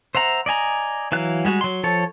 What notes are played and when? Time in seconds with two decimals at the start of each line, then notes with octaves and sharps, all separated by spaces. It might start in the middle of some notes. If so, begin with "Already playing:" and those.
0.15 C5 E5 F#5 A#5
0.46 D5 D#5 G#5 A#5
1.12 E3 F#3 F5 F#6
1.45 G3 G#3 F#4
1.61 F#3 C6
1.83 F3 A4 C#5